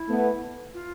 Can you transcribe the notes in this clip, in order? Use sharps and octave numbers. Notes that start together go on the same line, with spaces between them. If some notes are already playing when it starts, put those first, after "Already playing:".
Already playing: E4
A3 B3
F4